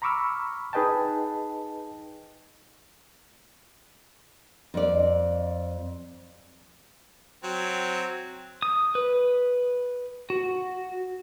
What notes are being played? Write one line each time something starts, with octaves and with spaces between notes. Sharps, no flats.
A#5 B5 C#6 D6 E6 F6
D#4 G#4 B4 D#5 G5 A5
F2 D5
F#3 C4
D#6
B4
F#4